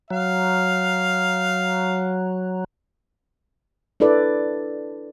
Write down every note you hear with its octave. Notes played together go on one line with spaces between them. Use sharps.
F#3 F5
D4 E4 A4 B4 D5